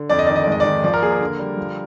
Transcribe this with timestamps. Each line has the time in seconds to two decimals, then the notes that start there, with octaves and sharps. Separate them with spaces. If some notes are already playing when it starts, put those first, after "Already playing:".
Already playing: D3
0.10 F2 D5
0.19 D#5
0.26 D#3 D5
0.36 D#5
0.44 D5
0.47 G#2 D#5
0.60 D5
0.65 D#3
0.84 F3 D5
0.94 A#4
1.02 A#3 G#4
1.12 A#4
1.20 D3
1.39 G3
1.57 F3